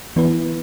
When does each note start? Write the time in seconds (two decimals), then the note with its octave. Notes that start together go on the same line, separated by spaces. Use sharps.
0.16 E3 B3 E4 B4